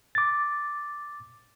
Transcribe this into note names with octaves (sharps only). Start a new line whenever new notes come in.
D6 A6